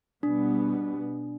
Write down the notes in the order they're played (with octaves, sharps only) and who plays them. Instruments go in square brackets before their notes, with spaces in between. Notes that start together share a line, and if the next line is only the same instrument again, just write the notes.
[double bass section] B2 G3 B3 [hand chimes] D4